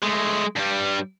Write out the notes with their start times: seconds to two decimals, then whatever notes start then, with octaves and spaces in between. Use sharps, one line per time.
0.03 G#3 A3
0.56 G2 G3